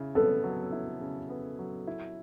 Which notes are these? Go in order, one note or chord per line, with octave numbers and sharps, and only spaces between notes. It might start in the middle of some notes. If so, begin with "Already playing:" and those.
Already playing: C#3 E4
B3 A4
F#3
E4
C#3
B3
F#3
E4